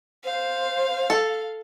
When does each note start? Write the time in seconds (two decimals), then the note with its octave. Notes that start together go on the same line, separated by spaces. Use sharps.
0.25 C5 F5
1.10 A4